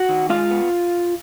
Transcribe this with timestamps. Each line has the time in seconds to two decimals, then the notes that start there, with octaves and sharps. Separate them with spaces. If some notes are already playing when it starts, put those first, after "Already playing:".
Already playing: F#4 F#5
0.09 D#3
0.29 G#3 F4 F5
0.51 B3